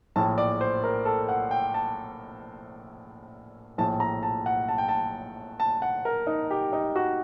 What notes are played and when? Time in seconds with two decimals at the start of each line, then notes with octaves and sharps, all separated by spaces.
0.16 A#1 A2 A5
0.38 D5
0.61 C5
0.84 A#4
1.05 A4
1.29 F#5
1.51 G5
1.74 A5
3.78 A#1 A2 A5
4.00 A#5
4.23 A5
4.46 F#5
4.69 A5
4.78 G5
4.88 A5
5.60 A5
5.82 F#5
6.05 A#4
6.27 D#4
6.51 G4
6.73 D#4
6.96 F#4